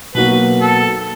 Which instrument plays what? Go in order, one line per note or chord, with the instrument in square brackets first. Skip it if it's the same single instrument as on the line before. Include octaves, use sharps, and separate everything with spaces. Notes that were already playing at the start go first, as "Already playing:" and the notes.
[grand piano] B2 F#3 A#3 D#4 F#4 [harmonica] B4
[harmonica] A4